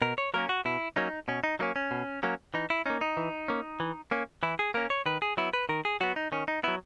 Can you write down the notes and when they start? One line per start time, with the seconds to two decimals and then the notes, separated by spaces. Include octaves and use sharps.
0.02 B2 A#4
0.18 C#5
0.34 F#3 A#3 C#4 A#4
0.49 F#4
0.65 B2 E4
0.96 F#3 A#3 C#4 D#4
1.28 B2 C#4
1.44 D#4
1.59 F#3 A#3 C#4 D#4
1.76 C#4
1.91 B2
2.23 F#3 A#3 C#4
2.54 E3 D#4
2.70 E4
2.86 A#3 C#4 D#4
3.01 D#4
3.17 E3
3.48 A#3 C#4
3.80 E3
4.11 A#3 C#4
4.43 E3 E4
4.59 G#4
4.74 A#3 C#4 A#4
4.90 C#5
5.06 D#3 B4
5.22 G#4
5.37 F#3 B3 E4
5.53 B4
5.69 D#3 A#4
5.85 G#4
6.01 F#3 B3 F#4
6.16 D#4
6.32 D#3 C#4
6.48 D#4
6.63 F#3 B3 E4